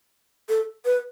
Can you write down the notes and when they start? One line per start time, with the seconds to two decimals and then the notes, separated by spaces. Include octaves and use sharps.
0.49 A4
0.85 B4